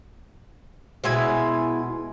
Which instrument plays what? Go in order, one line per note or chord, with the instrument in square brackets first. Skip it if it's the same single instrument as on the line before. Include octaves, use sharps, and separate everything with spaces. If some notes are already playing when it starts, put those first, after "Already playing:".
[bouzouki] B2 G#3 E4 G#5